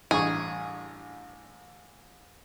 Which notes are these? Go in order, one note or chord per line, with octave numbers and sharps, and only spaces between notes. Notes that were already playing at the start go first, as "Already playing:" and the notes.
A1 G2 G#4 C#6